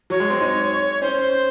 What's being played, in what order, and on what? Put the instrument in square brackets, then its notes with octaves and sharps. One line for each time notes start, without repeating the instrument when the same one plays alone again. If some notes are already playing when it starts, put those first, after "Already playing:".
[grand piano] F#3 [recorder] C#5
[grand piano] G#3
C4
D#4
[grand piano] C#4 [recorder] C5